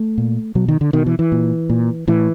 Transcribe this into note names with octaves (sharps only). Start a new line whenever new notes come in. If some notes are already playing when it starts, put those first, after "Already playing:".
Already playing: A3
A#2
B2 F#3
D#3
D3
B2 D#3
E3
E3
A#2
A#2
A2 E3